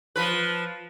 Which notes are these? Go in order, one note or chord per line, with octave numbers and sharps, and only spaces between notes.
F3 B4